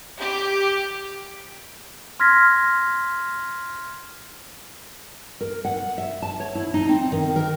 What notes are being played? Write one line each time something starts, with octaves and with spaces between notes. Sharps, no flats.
G4
C6 F6 G#6 A#6 B6
A#4
F#5
E5
A5
C#5
E4
D#4
C4
D#3
A#4